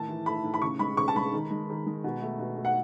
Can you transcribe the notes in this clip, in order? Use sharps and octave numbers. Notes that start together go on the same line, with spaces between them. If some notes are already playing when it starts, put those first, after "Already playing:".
Already playing: A2 D#3 A5
E3
A3 B5
A2
B5
C#3 C#6
G#3 B5
C#3 C#6
A5
G#3 B5
D#3
G#3
D#3
G#3
B2
A3
B2
A3
F#5